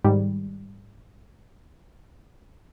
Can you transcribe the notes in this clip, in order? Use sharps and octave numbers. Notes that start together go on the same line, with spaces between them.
G#2 D#3 G3